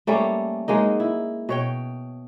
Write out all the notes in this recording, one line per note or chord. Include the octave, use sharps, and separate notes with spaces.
G3 A3 A#3 C#4
F#3 G#3 A#3 D#4
E4
B2 C#5 G5